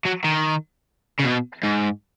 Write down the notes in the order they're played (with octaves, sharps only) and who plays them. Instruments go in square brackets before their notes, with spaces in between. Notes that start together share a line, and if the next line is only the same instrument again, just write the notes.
[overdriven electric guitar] F#3
D#3
C#3
B2
G#2